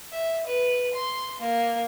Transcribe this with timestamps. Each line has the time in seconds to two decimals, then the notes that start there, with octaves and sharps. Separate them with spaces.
0.12 E5
0.46 B4
0.93 C6
1.40 A#3